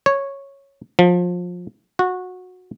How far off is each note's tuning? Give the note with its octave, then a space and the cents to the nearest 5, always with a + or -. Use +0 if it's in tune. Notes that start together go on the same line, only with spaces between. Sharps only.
C#5 -5
F3 +25
F#4 -20